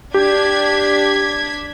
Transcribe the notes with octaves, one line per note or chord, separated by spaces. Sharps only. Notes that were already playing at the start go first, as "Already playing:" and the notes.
D4 G4 G#6 B6